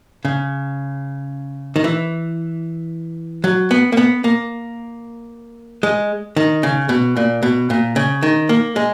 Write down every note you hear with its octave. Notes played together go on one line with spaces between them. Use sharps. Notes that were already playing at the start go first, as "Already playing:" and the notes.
C#3
D#3
E3
F#3
B3
A#3
B3
A#3
G#3
D#3
C#3
B2
A#2
B2
A#2
C#3
D#3
A#3
G#3